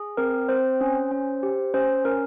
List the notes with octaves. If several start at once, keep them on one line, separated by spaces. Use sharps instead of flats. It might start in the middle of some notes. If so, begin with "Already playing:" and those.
Already playing: G#4
C4 A#4
C4 C5
C#4
C#4
G4
C#4 C5
C#4 A#4